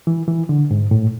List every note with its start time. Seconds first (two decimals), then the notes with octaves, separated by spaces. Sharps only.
0.07 E3
0.28 E3
0.49 D3
0.71 G#2
0.91 A2